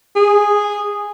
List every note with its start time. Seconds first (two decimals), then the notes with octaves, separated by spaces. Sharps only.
0.16 G#4